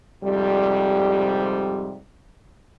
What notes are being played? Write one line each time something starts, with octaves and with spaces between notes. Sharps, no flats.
F2 G#2 C3 G3